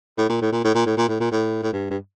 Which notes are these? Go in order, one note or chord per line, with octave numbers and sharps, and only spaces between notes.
A2
A#2
A2
A#2
A2
A#2
A2
A#2
A2
A#2
A2
A2
G2
G2